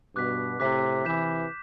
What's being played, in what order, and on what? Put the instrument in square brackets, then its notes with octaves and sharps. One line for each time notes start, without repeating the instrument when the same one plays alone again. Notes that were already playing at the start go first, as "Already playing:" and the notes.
[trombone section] G2 B2 [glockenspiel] D6 F#6 B6
[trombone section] A2 C3 [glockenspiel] D6 F#6 B6
[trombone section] C3 E3 [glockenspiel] G6 B6 E7